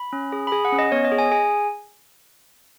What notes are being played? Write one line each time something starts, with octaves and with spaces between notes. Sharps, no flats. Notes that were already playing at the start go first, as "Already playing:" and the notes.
Already playing: B5
C#4
G#4
B5
G#4 G#5
F#5
C#4
D#5
B3 C#5
D#5
G#4
G#5
G#4 G#5